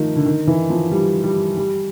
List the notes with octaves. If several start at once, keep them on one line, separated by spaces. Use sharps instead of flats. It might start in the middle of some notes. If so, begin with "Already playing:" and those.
Already playing: D#3 F3 A3
D3
D#3
E3
F3
G3
G3
G3